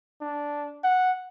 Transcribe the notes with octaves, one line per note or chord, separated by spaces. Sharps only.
D4
F#5